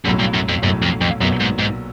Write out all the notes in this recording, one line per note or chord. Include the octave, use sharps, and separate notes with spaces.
B1 F#2 A2 F#3
G2
F#2
F2
B1 F#2 A2 F#3
F2
F2
B1 F#2 A#2 F#3 B3
G#2
G#2